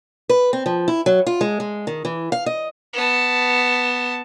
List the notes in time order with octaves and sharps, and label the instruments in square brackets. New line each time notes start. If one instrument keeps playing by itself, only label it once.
[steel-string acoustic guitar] B4
C4
F3
E4
F#3
F4
G#3
G#3
D#3
E3
F5
D#5
[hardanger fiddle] B3 A5